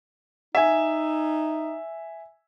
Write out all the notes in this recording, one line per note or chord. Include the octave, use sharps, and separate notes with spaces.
D#4 E5 G#5